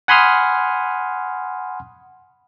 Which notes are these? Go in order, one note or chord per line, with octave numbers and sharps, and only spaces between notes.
F#5 G#5 B5 C6 D#6 F6